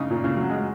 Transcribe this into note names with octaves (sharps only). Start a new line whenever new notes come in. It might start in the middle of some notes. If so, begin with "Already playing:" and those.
Already playing: C#3 D#4
A#2
C#3
F#3
G#3